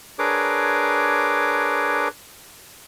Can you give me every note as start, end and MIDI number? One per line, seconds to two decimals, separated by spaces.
0.19 2.08 62
0.19 2.08 68
0.19 2.08 70
0.19 2.08 71
0.19 2.08 73
0.19 2.08 86